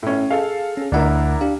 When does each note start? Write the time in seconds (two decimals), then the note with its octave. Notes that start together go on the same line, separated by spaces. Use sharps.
0.03 A2 C#4
0.31 G#4 A4 F5
0.77 C#4 G#4
0.92 D2 D4 E4 A#4 F#5
1.41 D4 G4 F5